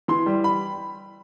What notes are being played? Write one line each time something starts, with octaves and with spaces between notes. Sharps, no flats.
E3 C6
G3
B5